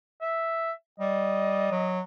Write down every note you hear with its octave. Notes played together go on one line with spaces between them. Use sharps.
E5
G3 D#5
F#3